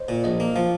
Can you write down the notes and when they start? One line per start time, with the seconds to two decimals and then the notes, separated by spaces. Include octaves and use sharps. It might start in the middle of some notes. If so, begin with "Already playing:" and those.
Already playing: C5 C#5 D#5
0.09 A#2
0.24 A#1 D#5
0.40 A#3
0.56 F3 F5